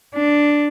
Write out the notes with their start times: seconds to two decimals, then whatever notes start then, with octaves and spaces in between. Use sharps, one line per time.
0.15 D4